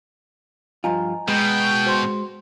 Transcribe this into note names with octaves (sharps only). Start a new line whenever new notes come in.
G2 F3 F4 D#5 G#5 A#5
B2 G#3 G5
F#4 C5 C6